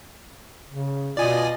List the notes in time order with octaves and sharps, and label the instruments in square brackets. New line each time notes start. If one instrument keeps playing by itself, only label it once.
[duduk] C#3
[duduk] B2 [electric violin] F4 D#5 [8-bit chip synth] D5 G#5